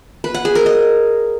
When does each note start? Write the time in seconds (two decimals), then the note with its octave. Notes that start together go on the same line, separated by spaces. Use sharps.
0.24 B4
0.34 F#5
0.45 G#4
0.55 A#4
0.66 D#5